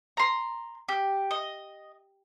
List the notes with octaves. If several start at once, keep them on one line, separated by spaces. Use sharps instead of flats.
A#5 C6
G4
D#5